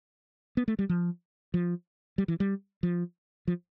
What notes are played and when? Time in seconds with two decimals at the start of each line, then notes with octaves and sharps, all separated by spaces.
0.57 B3
0.68 A3
0.79 G3
0.89 F3
1.54 F3
2.18 G3
2.28 E3
2.40 G3
2.83 F3
3.48 F3